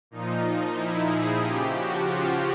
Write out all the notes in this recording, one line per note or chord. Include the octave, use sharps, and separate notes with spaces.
A#2 F3 D#4
E4
G#4
C#3 F3 G4
F#4
F4